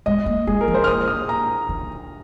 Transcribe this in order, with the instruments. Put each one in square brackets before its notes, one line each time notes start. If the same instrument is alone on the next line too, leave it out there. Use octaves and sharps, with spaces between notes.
[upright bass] G#3 [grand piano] D#5
[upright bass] A#3
[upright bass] G#3 [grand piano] G#4
[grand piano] A#4
[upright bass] F3
[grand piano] C5
F6
[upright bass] A#3 [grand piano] D#6
[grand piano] D#6
A#5
[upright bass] D#3